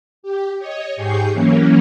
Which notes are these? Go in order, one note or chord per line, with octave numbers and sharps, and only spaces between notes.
G4
C#5 D#5
G#2 G4 G#4 C#6 G6 C7
E3 F#3 A#3 C#4